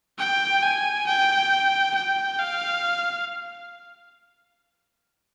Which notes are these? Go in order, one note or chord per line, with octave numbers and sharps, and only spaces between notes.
G5
G#5
G5
G5
F5